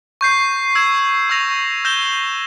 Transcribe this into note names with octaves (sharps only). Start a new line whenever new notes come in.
C#6 G6 C7
E6 G#6 E7
C#6 E6 A#6 F7
E6 G6 A#6 E7 G7